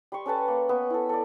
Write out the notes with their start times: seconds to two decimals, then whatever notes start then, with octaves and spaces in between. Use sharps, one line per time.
0.12 G3 C6 C#6
0.26 C#4 A4 B4 A5
0.48 A#3
0.69 B3 E5
0.90 E4 A4
1.09 A4 D5